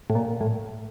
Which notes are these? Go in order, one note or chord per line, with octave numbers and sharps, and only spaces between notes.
A2
A#2
A2